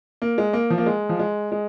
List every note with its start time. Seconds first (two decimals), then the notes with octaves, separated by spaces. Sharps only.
0.22 A#3
0.38 G#3
0.53 A#3
0.70 F3
0.78 A#3
0.86 G#3
1.09 F3
1.19 G#3
1.52 G#3